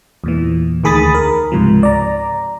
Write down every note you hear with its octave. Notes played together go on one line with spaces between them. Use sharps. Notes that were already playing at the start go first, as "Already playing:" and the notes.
E2 A#2 E3
D2 D#3 G#4 B5 D#6 A6
A#4
C#2 G#2 C3 F3
D5 A#5